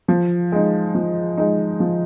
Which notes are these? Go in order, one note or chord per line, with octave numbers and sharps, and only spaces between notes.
F3
G#3 D#4
F3
G#3 D#4
F3